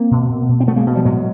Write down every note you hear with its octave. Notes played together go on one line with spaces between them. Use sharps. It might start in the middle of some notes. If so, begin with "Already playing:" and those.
Already playing: A#3 C4
B2
B2
B2
C4
B2 A3 B3
G#3 A#3
B2
F3 G3
A2 F#3 G#3